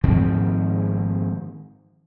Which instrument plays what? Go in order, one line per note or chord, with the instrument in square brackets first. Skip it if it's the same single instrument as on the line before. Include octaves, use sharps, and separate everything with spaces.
[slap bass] G#2 D#3 F3 C4